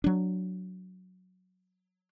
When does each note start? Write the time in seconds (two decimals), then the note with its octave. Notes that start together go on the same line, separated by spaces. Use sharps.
0.04 F#3 D4